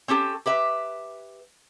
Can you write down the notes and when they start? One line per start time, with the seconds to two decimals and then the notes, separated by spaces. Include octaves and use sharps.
0.08 C4 C#4 G4 A4
0.46 G4 B4 E5